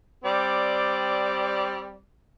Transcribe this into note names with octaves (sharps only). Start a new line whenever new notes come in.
G3 C4 D5